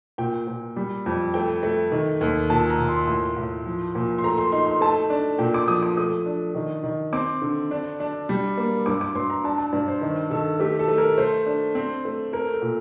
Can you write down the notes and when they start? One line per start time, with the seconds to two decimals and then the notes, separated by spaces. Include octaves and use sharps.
0.18 A#2 G5
0.47 A#2
0.76 G3
1.06 F2
1.34 A3 G5
1.63 A3
1.92 D#3
2.21 D#2
2.50 A#2 A5
2.70 A#5
2.78 A#2
2.88 C6
3.07 A2 C6
3.37 A2
3.66 F3
3.95 A#2
4.18 C6
4.24 A3 A#5
4.37 C6
4.52 D#4 C6
4.66 C6
4.81 A3 A5
5.10 D4
5.39 A#2 G5
5.54 D6
5.68 F3 D#6
5.82 D6
5.97 A3 D#6
6.26 D4
6.55 D#3
6.83 D#3
7.13 C4 D6
7.42 D3
7.71 D4
8.00 D4
8.29 G3
8.57 A#3
8.86 G2 D6
9.01 D6
9.15 G2 C6
9.30 A#5
9.44 D4 A5
9.58 A5
9.73 G2 D5
9.88 C5
10.02 D#3
10.30 D#3 A4
10.59 A3 G4
10.79 A4
10.88 A3
10.98 A#4
11.18 A3 C5
11.46 D4
11.75 C4
12.05 A3
12.33 A3 A#4
12.53 A4
12.62 A#2